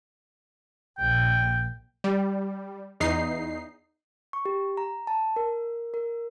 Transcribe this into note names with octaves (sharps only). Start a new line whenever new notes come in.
A#1 G5
G3
E2 D#4 C7
C#6
G4
A#5
A5
A#4
A#4